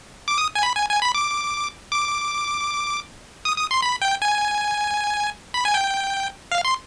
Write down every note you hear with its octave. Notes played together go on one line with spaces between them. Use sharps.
D6
D#6
G#5
B5
G#5
G#5
B5
D6
D6
D#6
D#6
C6
B5
G5
G#5
B5
G#5
G5
F5
C6